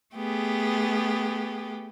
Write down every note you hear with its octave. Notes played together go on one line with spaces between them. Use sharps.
A3 B3 G4 G#4